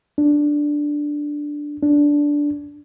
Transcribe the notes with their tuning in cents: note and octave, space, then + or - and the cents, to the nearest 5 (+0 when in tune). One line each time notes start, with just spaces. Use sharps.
D4 +0
D4 -10